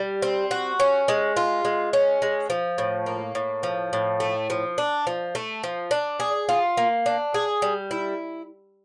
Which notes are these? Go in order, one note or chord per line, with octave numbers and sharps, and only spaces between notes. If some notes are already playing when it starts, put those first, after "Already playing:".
Already playing: G3
C4
F#4
C#4
G#3
F4
G#3
C#4
G#3
F3
A2
A#3
A2
F3
A2
A3
F3
D4
F3
A3
F3
D4
G#4
F4
A#3
D4
G#4
G3
E4